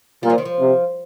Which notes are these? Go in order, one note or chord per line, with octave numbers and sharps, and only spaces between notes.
A#2 G3
F3
D#3
F3
C3